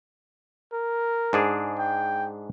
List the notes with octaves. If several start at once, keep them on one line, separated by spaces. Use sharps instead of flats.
A#4
G#2 D4 G#4
G5